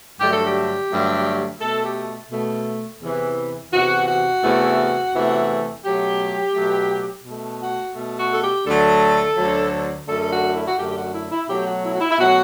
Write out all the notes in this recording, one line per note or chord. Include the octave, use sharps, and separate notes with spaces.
G2 D3 F#3 A3 G4
A4
G4
G2 D3 F#3 A3
B2 A3 A4
G4
B2 A3
E2 C3 E3
E2 C3 E3 F#4
F#4
E2 C3 E3 A3
E2 C3 E3 A3
B2 F#3 A3 G4
B2 F#3 A3
B2 A3
F#4
B2 A3
F#4
A4
G4
D2 D3 F#3 A3 A4
D2 D3 F#3 A3
F#2 D3 A3 A4
A4
F#4
E4
F#4
F#2 D3 A3 G4
G4
F#4
E4
E4
B2 F#3 A3 G4
F#4
E4
F#4
E4
E4
B2 F#3 A3 F#4